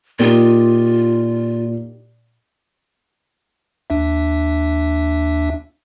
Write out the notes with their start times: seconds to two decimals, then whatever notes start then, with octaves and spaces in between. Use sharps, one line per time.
0.19 A#2 D#4 F4 G4 A#4
3.90 D#2 D4 E5